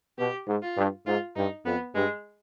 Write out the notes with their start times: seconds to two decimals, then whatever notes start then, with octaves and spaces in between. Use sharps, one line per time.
0.18 B2 G4
0.48 G#2
0.62 F4
0.77 G2
1.07 G#2 F4
1.36 G2 D#4
1.65 F2 B3
1.95 G2 G#3